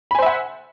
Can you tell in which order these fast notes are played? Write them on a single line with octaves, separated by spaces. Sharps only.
B5 G#5 C5 E5 F#5